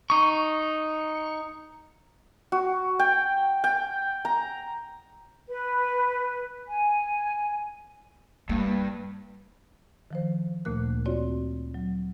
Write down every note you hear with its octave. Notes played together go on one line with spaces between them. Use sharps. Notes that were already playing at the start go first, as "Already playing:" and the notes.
D#4 C#6
F#4
G5
G5
A#5
B4
G#5
G2 A#3
D#3 F3 C5
D2 A#2 A3 A#3 A#4 F#6
C4 F4 F#4 C#5 D5
F#3